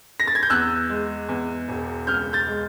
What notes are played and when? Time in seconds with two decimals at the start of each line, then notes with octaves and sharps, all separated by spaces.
0.20 A#6
0.28 A6
0.35 G#6
0.43 G6
0.50 E2 E6 F#6
0.89 G#3
1.29 E2
1.68 E1
2.07 C#2 F6 G6
2.33 G6 A6
2.47 G#3